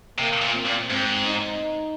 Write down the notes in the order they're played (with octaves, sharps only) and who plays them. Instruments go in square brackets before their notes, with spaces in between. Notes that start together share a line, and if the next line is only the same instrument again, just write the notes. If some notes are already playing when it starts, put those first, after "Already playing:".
[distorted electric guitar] C3 [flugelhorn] A#3
[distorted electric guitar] A#2
[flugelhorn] C4
[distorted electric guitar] A#2
[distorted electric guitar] G#2 [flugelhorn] C4
[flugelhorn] D#4